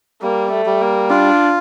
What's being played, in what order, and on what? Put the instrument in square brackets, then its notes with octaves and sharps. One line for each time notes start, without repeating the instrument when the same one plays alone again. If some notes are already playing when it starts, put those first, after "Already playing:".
[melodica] G3 [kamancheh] A#3
[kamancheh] A3
[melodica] G3
[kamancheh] A#3
[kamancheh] D4 [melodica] F4